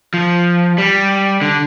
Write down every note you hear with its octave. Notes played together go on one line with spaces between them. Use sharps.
F3
G3
D3